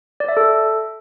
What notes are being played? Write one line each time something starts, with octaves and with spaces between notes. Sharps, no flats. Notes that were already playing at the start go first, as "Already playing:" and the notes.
D5
E5
A4